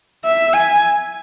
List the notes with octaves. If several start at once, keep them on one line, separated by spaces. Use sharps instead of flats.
E5
G#5